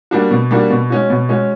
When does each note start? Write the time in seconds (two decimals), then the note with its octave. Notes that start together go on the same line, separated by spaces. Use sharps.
0.11 G3 A#3 D4 F#4
0.31 B2
0.51 G3 A#3 D4 F#4
0.70 B2
0.90 G#3 C#4 F#4
1.10 B2
1.29 G#3 C#4 F#4